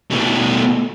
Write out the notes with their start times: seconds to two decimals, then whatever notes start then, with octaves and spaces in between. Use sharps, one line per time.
0.11 B2 A3